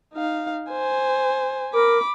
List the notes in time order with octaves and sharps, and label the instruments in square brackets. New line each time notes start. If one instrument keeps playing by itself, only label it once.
[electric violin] D#4 F5
C5 G#5
[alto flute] A#4 [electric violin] B5 D6